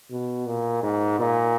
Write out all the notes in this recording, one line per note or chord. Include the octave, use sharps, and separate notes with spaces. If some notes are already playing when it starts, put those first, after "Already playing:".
B2
A#2
G#2
A#2